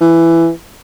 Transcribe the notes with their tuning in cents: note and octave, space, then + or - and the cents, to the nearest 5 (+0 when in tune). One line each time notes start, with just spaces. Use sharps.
E3 +10